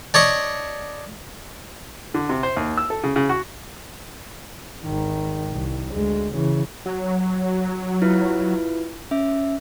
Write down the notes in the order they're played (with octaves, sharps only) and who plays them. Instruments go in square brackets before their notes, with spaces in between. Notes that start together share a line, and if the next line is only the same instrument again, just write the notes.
[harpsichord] D4 C#5 D#5 C#6
[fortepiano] D3
C3
C5
D#2
E6
A4
C#3
C#3
F#4
[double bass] G#1 D#3
C2
D2 G#3
C#3 E3
[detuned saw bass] F#3
[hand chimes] E4 F4 B4
C#4 E5